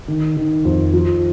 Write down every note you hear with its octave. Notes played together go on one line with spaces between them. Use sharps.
D#3
D#3
F2
F3